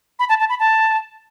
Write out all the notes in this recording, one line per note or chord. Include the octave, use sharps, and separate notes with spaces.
B5
A5
A5
B5
A5